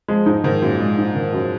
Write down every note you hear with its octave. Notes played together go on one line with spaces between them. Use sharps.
F3 G#3
G#2 D#4
G#2 D#3
F#2 A#2
G#3
D#4
D#3
F#2